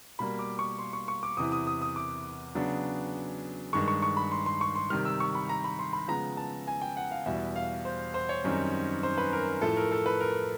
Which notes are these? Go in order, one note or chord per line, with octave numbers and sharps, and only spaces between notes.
B2 G3 A#3 B5
D6
C#6
C6
C#6
C#6
D6
E2 C3 E3 D#6
D#6
D#6
D#6
D6
C#3 F#3 B3 D4
G2 D#3 G#3 C#6
C#6
C#6
B5
C6
C6
C#6
C6
C3 D#3 G3 F6
E6
C#6
B5
A#5
B5
C6
B5
C#3 F3 G#3 B3 A#5
A5
G#5
G5
F#5
F5
E2 B2 G3 E5
F5
C5
C5
C#5
F#2 D#3 G3 C4 D#4
C5
B4
A#4
A2 F3 A3 A4
A#4
A4
B4
A#4